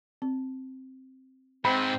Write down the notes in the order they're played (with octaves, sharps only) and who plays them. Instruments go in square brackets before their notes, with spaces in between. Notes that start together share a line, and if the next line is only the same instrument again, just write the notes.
[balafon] C4
[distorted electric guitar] G#2 [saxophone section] C4 [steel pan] B5